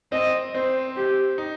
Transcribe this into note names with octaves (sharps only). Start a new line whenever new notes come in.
C4 D#5
C4 C5
G4
D#4